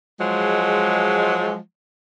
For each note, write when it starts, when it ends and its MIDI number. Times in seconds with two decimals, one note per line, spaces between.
0.19 1.58 53
0.19 1.58 54
0.19 1.58 56